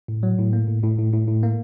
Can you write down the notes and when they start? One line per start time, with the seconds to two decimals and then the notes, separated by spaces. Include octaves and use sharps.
0.08 A2
0.23 F#3
0.38 A2
0.53 A#3
0.68 A2
0.83 A2
0.98 A2
1.13 A2
1.28 A2
1.43 A#3